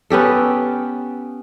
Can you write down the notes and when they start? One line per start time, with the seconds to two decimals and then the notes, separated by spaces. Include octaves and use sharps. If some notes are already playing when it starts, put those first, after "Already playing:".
0.10 B3 C#4 G4 A4